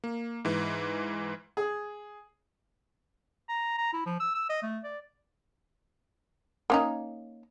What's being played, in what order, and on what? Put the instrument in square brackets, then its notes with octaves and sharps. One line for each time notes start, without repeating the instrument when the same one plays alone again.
[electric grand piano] A#3
G#2 E3
[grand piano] G#4
[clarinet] A#5
A#5
E4
F3
E6
E6
D#5
A3
D5
[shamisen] A#3 C#4 D#4